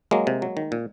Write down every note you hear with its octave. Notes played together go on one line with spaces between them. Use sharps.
F#3 G#3 A#3
C3
F#3
D#3
A#2